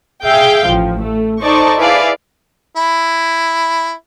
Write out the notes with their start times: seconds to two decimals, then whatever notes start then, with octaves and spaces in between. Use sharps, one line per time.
0.25 G#4 E5 F5 G5 G6
0.66 A1 F3
0.99 A3
1.41 D#4 A4 C5 D5 A5 C#6
1.79 E4 G#4 B4 D5 E5 F5
2.77 E4